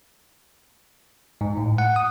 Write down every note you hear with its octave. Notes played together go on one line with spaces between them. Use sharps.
G#2
A2
F#5
D#6